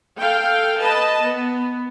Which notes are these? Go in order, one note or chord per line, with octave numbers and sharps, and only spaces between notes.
A4 F5 G5
B4 D#5 A5
B3